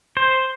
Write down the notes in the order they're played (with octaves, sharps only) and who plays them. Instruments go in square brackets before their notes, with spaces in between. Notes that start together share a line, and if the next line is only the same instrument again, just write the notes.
[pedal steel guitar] C5